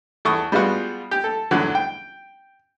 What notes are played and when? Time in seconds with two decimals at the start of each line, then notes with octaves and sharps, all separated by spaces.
0.25 E2 A4 C#6 D#6
0.52 G3 G#3 B3 F4 F#4
1.11 G4
1.24 A4
1.51 E2 D3 F#3
1.75 G5